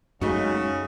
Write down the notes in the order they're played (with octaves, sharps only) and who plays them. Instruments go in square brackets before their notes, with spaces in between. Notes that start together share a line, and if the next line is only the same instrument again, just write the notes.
[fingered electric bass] F#2 G#3 [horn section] C#3 [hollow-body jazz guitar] A3 D#4 F#4